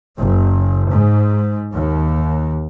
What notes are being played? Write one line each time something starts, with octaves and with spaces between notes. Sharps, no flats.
F#1
G#2
D#2